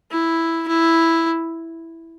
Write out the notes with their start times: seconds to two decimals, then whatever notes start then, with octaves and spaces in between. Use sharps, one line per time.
0.11 E4
0.68 E4